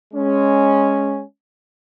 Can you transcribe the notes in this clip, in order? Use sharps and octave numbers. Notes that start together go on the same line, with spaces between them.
G#3 C#4